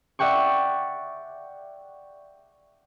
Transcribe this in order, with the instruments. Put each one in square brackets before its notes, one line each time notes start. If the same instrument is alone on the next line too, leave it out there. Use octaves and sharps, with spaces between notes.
[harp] D5 E5 F#5 G5 C#6